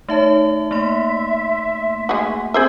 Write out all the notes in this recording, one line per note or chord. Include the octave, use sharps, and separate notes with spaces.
A3 D#4 C#5 E5 A5
A3 A#3 E5 C6
G#3 F#4
C4 G#4 C5 E5